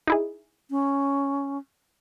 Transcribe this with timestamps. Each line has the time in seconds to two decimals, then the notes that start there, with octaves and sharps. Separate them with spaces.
0.07 D#4 E4 G#4
0.71 C#4